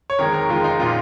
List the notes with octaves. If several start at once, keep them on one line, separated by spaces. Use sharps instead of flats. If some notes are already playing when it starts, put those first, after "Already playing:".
C#5
F2 D#3 G#3 A#4
A#4
F2 D#3 G#3 F4
D#4
A#2 A#3 F4